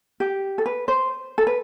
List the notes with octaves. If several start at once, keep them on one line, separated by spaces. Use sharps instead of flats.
G4
A4
B4
C5
A4
B4